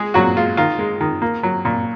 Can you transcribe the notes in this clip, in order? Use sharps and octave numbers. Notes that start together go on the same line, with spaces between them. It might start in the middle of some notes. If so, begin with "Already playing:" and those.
Already playing: G#3 G#4
A#2 F#3 F#4
G#3 F4
D#3 F4
G#3
D#3
A#3
F#3
A#2